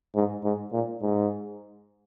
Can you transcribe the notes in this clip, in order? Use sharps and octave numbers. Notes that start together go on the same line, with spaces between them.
G#2
G#2
A#2
G#2